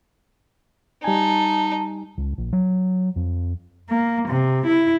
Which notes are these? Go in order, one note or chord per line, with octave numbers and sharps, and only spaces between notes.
G3 D#4 G#5 A5
C#2
A#1
F#3
F2
A#3
C3
E4